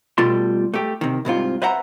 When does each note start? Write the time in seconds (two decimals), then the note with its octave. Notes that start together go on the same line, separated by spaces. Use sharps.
0.18 B2 G3 A3 F4 A4 C6
0.74 A3 G4
1.01 C3 D#3
1.25 C2 G#2 C3 F4
1.62 B4 C5 E5 F#5 A#5